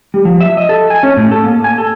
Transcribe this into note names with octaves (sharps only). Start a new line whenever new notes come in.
G3
F3
E5
D#5
A4
G#5
C#4
A2
A4
A#3
G#5
A4